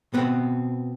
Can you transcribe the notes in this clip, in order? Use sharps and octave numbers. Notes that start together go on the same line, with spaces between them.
B2 B3 C4